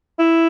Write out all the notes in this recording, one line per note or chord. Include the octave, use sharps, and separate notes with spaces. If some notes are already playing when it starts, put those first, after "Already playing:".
E4